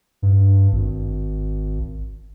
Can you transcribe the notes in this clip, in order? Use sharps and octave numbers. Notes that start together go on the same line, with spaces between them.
G2
G#1